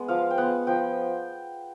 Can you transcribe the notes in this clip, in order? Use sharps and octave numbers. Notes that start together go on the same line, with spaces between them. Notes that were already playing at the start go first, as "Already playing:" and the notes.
Already playing: G#3 B3
F3 F5
G5
G#3 B3 F#5
F3 G5